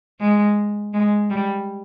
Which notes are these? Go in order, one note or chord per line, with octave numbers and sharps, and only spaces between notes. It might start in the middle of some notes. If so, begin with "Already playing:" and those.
G#3
G#3
G3